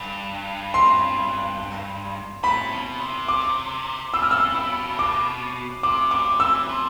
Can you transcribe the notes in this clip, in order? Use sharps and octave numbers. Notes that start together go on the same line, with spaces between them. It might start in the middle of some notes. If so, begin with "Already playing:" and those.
Already playing: G2
C6
A2 B5
B2
C3
D6
B2 E6
F6
E6
E6
D6
C3 D6
D3 D6
E3 E6
F3